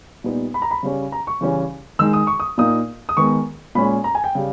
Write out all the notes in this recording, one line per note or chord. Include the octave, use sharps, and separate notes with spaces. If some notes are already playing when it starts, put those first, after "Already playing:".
A#2 G3 B3 D#4
B5
A#5
B5
C#3 G3 C#4
A#5
C#6
C#3 E3 G3 C#4
D#3 G#3 D#4 E6
D#6
C#6
D#6
A#2 A#3 D#4 D#6
D#6
D#3 G#3 B3 C#6
A#2 G#3 C#4 B5
A#5
G#5
G5
C#3 G3